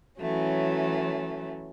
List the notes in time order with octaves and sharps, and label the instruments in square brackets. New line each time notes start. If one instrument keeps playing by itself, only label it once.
[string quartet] E3 F#3 A3 C#4